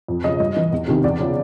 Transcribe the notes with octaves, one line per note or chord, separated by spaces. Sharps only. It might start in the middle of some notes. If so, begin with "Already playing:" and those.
F2
C#3 F3 D#5
G2 D#5
E3
E2
C3 D#3
E2 D5
C#3 F3